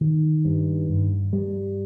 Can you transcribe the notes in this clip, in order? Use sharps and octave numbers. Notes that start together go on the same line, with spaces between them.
D#3
G2
G2
G3